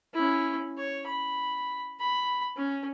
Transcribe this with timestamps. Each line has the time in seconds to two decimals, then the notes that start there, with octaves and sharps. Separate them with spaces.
0.13 C#4 E4
0.77 C#5
1.06 B5
2.00 B5
2.56 C#4